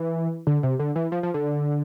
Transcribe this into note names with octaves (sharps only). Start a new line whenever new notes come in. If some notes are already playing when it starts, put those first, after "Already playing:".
Already playing: E3
D3
C3
D3
E3
F3
F3
D3